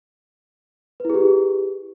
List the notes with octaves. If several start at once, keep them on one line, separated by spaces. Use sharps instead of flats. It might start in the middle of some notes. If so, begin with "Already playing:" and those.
E4 G4 G#4 B4